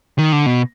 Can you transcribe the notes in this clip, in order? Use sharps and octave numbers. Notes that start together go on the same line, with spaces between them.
D#3
D3
B2